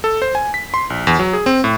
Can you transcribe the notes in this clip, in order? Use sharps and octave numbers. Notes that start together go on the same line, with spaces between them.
A4
C5
G#5
B6
C6
A#1
E2
F#3
G#4
C4
A2